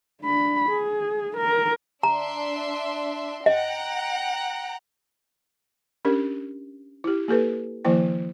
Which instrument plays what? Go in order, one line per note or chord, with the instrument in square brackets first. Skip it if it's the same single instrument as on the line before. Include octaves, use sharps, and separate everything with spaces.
[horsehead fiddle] D4 B5
G#4
A#4
[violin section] D4 E5 C6 [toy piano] A#5
[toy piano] D#5 [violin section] F#5 G5 A#5
[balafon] C#4 D4 G4 A#4
E4 G4
A#3 G4 A4 B4
D#3 F3 A#3 E4 C5 G5